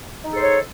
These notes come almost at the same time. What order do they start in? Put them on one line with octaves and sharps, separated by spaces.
D#4 A4 G#4 C5 C#5